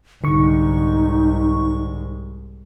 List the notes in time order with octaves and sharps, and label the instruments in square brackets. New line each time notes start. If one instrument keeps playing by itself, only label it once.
[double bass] C2 G#2 [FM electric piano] D3 C#6 [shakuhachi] D#4